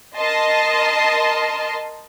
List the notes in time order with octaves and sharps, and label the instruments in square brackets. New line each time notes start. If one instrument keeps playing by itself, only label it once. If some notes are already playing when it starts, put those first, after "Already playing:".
[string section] A#4 D#5 A5 C6